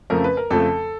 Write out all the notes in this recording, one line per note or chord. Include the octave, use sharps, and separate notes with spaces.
F2 C#3 F3 A3 A#4
B4
A#4
F2 C#3 F3 A3 A4